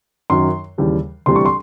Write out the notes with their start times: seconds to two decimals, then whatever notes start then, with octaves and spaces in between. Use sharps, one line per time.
0.30 F#2 D#3 F#3 C6
0.78 D#2 C#3 E3 G3
1.26 D2 C3 E3 G3 C6
1.36 C#6
1.45 C6